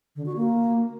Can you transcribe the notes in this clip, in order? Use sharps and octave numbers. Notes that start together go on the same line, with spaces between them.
D3
F#4
A#3